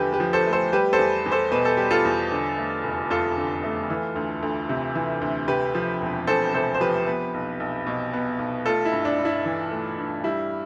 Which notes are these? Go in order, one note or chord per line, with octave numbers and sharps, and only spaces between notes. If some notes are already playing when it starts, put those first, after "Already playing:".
Already playing: E2 D3 F3 A3 G4 B4
G4 B4
F3
A4 C5
A3
A4 C5
G3 G4 B4
A4 C5
E2
E2
A4 C5
B2 B4
A4
G3 G4
F4 A4
E2
D3
A3
F1
F2 F4 A4
D3
A3
E3
D2
D2
C3
E3
D2
C3 G4 B4
F3
E1
E2 A4 C5
C3 A4 C5
C5
F3 G4 B4
B3
B1
B1
B2
B3
B1
A3 F4 A4
E4
G2
D4
G2
E4
E3
A3
G2
G3 E4